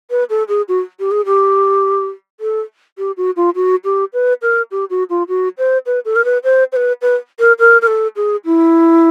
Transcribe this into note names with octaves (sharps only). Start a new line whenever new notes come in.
B4
A4
G#4
F#4
G4
G#4
G4
A4
G4
F#4
F4
F#4
G4
B4
A#4
G4
F#4
F4
F#4
C5
B4
A4
A#4
B4
C5
C5
B4
B4
A#4
A#4
A#4
A4
G#4
E4